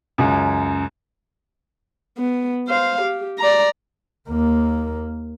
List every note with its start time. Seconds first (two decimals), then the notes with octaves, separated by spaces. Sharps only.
0.18 C#2 F#2
2.18 B3
2.68 C5 F5
3.02 G4
3.39 D5 A#5
4.29 D#2 A#3